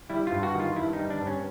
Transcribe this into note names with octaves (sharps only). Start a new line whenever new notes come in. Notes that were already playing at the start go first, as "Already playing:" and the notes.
G3 E4
F4
G2
F#4
D#3
F4
G2 E4
D#4
G3
D4
G2
C#4